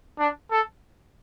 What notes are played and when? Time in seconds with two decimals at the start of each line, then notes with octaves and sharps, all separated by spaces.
0.19 D4
0.51 A4